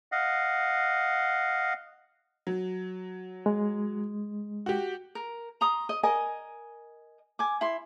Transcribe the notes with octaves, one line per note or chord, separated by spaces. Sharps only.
D#5 F5 F#5
F#3
G#3
F#4 G4
A#4
A#5 C6 D#6
D#5
A#4 D#5 G#5
G#5 D6
E4 C6